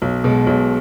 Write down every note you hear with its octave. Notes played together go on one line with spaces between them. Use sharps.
B1
B2 G#3
B1